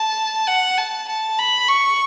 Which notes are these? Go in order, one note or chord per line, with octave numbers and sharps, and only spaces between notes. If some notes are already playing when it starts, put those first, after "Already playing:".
Already playing: A5
F#5
A5
A5
B5
C#6